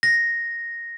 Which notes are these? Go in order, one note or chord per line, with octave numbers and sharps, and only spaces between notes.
A#6